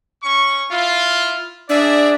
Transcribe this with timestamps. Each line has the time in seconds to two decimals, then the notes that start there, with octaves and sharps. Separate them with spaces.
0.23 C#4 C#6
0.71 E4 F4
1.69 D4 G#4 D5 E5